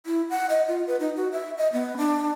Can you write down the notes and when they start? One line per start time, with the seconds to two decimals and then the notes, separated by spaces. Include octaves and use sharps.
0.06 E4
0.30 F#5
0.50 D#5
0.68 F4
0.87 B4
1.00 D#4
1.16 F#4
1.32 E5
1.58 D#5
1.73 B3
1.97 D4